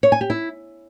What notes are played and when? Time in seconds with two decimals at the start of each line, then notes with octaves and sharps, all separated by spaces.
0.03 C#5
0.12 G#5
0.21 G4
0.30 E4